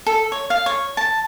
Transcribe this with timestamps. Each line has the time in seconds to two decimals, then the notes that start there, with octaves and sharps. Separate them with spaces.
0.06 A4
0.32 C#5
0.50 F5
0.66 C#5
0.97 A5